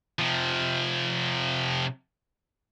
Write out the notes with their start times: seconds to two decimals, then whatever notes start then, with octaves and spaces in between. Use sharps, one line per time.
0.19 C3 F3